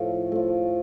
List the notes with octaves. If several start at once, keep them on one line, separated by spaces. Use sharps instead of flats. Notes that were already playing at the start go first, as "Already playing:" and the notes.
Already playing: A2 F3 A3
F3 A3